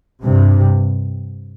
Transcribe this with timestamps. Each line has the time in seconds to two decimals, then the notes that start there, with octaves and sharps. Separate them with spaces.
0.24 G2 C3